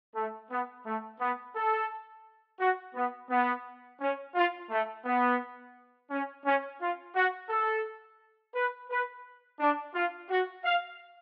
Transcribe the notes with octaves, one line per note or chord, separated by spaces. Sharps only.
A3
B3
A3
B3
A4
F#4
B3
B3
C#4
F4
A3
B3
C#4
C#4
F4
F#4
A4
B4
B4
D4
F4
F#4
F5